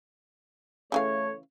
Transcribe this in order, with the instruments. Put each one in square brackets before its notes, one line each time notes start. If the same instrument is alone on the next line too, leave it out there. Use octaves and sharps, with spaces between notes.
[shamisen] C#3 E3 F5 [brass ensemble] A3 C#5